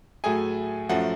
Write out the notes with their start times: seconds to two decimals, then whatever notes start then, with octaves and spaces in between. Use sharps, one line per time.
0.24 A2 F#3 A3 G#4 G#5
0.89 F#2 F3 A3 F#4 F#5